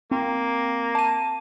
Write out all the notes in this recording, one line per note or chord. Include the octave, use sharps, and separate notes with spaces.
A#3 C4
A5 D#7